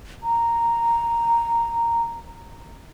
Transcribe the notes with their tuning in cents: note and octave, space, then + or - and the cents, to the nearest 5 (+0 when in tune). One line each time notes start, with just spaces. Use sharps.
A#5 -5